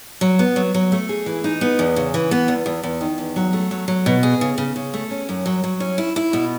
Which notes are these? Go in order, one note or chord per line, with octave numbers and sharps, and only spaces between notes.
F#3
B3
F#3
F#3
A3
G#4
E3
D#4
B3
E2
C#3
E3
B3
E2
E2
E2
D#3
E2
F#3
A3
F#3
F#3
B2
G#4
C#3
C#3
C#3
A3
C#4
F#2
F#3
F#3
C#4
E4
E4
B2